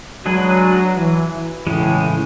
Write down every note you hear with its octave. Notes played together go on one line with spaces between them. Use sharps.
F#3 G#3 D4 G#4 B4
E3
A2 C#3 E3 G#3